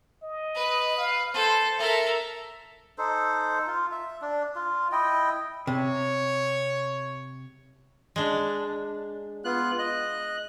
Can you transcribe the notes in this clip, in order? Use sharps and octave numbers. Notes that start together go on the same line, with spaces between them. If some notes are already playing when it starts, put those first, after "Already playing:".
D#5
B4
F5
A4 C5
A4 A#4 E5
D#4 A4 C5
F4
E5
D4
F4
E4 D#5 G5
C3 C#5
G#3 D4
B3 F4 F#6
D#5 F#6